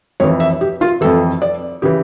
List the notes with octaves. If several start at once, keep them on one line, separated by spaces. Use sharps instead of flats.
F2 E3 C#5
E5
G4
F4
F2 E3 A4
D5
C#3 E3 G4